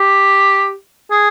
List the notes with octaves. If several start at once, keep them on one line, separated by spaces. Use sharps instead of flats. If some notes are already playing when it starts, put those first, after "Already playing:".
Already playing: G4
G#4